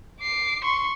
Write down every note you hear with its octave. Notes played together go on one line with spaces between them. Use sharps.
D6 C7
C6 C#6